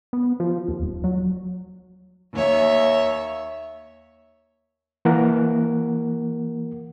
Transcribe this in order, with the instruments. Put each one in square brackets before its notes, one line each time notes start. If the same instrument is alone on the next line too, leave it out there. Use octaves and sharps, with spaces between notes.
[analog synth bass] B3
F3
D#2
D#1
F#3
[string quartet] D#2 C#5 E5
[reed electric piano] E3 A#3 A#4 F#5